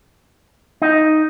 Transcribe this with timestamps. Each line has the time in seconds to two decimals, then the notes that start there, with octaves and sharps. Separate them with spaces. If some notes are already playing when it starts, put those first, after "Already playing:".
0.82 D#4